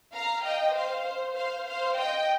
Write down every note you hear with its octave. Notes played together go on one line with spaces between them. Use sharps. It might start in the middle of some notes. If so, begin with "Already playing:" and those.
F5 A#5
D#5 G5
C5 F5
C5
C5 F5
C5 F5
D#5 G5